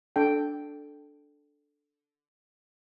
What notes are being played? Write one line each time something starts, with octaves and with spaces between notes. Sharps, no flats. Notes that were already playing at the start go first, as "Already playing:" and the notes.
D4 A4 G5